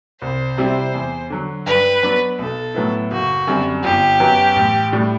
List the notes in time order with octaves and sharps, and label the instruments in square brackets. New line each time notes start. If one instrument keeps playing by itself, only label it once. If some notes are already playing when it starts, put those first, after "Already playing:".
[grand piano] C2 [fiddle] C5
[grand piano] C3 G3 C4 E4
E2
D3 F#3
[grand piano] G2 [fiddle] B4
[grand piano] F#3 B3 D4
[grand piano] B1 [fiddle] A4
[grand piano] A2 F#3 B3 E4
[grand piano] F#1 [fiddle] F#4
[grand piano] F#2 D3 G3 C4
[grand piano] G1 [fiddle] G4
[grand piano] F#2 F#3 B3
A1
A2 G3 D4